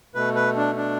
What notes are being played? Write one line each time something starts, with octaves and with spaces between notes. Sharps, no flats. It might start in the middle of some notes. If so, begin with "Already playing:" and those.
B2 A3 B4
B4
D4
D4